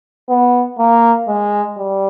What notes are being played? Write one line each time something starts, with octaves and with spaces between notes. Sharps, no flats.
B3
A#3
G#3
G3